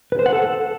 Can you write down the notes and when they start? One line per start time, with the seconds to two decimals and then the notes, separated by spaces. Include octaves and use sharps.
0.12 B4
0.19 C5
0.26 F#5
0.33 A4